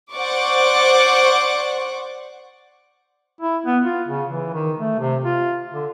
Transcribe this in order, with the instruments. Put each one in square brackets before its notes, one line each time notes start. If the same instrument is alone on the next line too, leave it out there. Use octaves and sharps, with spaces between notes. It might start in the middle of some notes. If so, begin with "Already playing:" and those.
[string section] C5 D5 F#5 C#6 D6
[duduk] E4
B3
F4
C#3
E3
D#3
A3
C3
F4
D3